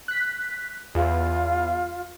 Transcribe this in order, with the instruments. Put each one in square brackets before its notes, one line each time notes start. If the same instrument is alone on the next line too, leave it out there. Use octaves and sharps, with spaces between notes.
[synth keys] F#6 B6
[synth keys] E2 [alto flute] F4